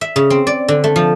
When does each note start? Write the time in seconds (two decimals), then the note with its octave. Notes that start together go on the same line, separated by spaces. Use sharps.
0.01 E5
0.16 C#3
0.30 C4
0.47 D5
0.68 D3
0.84 A3
0.96 F3